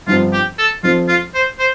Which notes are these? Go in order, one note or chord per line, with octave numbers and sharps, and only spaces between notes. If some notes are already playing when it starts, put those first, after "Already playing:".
G1 G2 F3 C4 F4
G4
A4
F2 F3 C4 F4
F4
C5
C5